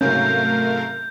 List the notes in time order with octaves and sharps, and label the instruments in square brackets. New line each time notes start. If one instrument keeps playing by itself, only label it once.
[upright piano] G#2 C3 F#3 [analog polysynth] A3 A#4 F5 [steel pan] C#4 [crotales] G6